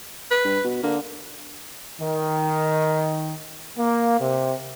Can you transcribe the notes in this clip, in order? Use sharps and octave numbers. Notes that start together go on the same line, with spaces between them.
B4
G2
B2
D3 A#3
D#3
A#3
C3